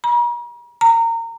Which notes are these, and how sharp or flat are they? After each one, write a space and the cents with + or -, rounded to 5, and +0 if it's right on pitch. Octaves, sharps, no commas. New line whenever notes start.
A#5 +45
A#5 -25